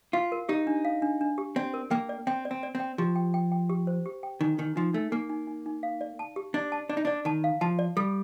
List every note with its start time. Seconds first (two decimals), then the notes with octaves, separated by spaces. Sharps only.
0.13 F4 F5
0.32 A#4
0.49 D#4 G4
0.67 D4
0.85 F5
1.02 D4
1.21 D4
1.38 G4
1.56 C4 D5
1.74 A#4
1.91 A#3 G5
2.09 D5
2.27 C4 G5
2.45 D5
2.51 C4
2.63 D5
2.75 C4
2.80 G5
2.98 F3 G4
3.16 G5
3.34 G5
3.52 G5
3.70 G4
3.87 C5
4.06 G4
4.23 G5
4.41 D#3 D#4
4.59 D#3 D#4
4.76 F3 D#4
4.94 A3 D#4
5.12 A#3 D#4
5.29 D#4
5.47 D#4
5.66 D#4
5.83 F5
6.01 D5
6.19 A5
6.36 G4
6.54 D4 D5
6.72 A5
6.89 D4 D5
6.97 D#4
7.05 D4 D5
7.25 D#3 A5
7.44 F5
7.61 F3 A5
7.79 D5
7.97 G3 A4